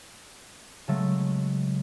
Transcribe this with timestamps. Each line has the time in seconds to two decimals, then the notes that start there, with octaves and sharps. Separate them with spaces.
0.88 C#3 F#3 G#3 A3 A4